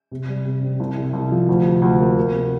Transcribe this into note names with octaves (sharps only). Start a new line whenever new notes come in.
C3
G3
C3
C4
C2
C3
C2
F3
D2
C3
D2
A#3
A#3
C3